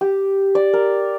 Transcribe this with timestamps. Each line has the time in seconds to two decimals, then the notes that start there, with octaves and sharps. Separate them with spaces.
0.01 G4
0.55 D5
0.73 A#4